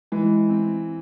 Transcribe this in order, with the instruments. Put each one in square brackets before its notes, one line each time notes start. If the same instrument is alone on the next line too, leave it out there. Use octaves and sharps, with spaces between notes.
[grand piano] E3 [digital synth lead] G#3
[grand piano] C4